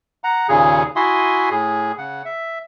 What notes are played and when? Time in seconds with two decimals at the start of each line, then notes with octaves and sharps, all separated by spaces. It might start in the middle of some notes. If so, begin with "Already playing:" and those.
0.24 F#5 A#5
0.49 D#2 A#2 C#3 G#4
0.96 E4 F#4 E5 G#5 C6 D#6
1.50 A2 G#4
1.98 C#3 F#5
2.25 E5